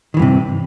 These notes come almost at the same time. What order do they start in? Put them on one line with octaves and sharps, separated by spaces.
D#3 E3 G2 C3